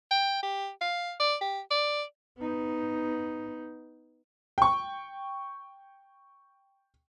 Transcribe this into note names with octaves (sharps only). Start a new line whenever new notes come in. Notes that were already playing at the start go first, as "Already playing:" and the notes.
G5
G4
F5
D5
G4
D5
B3 D#4
G5 C#6